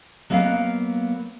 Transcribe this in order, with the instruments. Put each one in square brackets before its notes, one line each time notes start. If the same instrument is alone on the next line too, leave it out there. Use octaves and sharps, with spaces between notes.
[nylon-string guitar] F#3 A#3 B3 C#5 D#5 F5